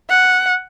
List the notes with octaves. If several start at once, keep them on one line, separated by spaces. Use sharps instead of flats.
F#5